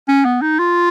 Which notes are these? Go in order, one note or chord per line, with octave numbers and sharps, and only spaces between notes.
C#4
B3
D#4
F4